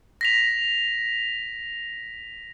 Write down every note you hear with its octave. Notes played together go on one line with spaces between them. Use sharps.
A#6 B6 F7